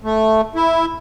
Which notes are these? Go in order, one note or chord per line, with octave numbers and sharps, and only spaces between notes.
A3
E4